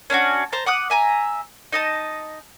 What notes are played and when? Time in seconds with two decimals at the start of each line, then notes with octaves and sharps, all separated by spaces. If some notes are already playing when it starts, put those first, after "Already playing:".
0.10 C#4 D4 E4 F#4
0.52 C5 A5 A#5
0.66 F#5 D6 D#6 F#6
0.90 E5 G#5 A#5
1.72 D#4 D#5 A5